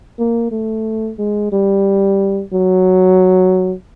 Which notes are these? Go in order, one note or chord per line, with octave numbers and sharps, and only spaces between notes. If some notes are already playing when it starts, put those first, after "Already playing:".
A#3
A3
G#3
G3
F#3